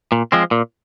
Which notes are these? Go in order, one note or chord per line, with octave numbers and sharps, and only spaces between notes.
A#2
F3 G#3 C4
A#2